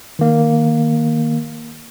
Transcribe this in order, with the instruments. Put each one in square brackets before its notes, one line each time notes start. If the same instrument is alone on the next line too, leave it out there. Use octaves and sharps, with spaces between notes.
[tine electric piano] D#3 A#3